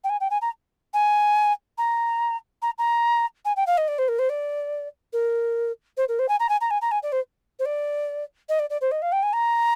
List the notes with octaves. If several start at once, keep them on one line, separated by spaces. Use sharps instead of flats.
G5
G#5
G5
G#5
A#5
G#5
A#5
A#5
A#5
G#5
G5
F5
D#5
D5
C5
A#4
C5
D5
A#4
C5
A#4
C5
G#5
A#5
G#5
A#5
G#5
A#5
G#5
D5
C5
C5
D5
D#5
D5
D5
C5
D#5
F5
G5
G#5
A#5